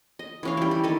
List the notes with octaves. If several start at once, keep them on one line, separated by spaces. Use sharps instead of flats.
D#5
E3 C#4 F5
G3 E4
E4
D#3 A4 D#5